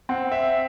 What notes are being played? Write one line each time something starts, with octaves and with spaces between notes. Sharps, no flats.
C4 F#5
E5